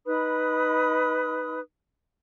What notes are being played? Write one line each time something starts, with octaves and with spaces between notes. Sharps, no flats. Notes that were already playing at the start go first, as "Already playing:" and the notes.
D#4 B4 B5 D#6